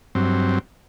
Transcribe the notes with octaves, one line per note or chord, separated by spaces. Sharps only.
G2 F#3 C4